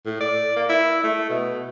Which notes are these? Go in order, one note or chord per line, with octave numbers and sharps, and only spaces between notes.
A2
D5
A#3
E4
A3
B2